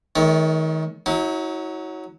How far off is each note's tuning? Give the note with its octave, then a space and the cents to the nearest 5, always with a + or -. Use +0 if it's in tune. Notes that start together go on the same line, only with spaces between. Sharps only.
D#3 +30 A3 -35 C#5 +20
F#3 +0 E4 -45